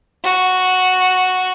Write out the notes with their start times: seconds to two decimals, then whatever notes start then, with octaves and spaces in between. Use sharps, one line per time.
0.24 F#4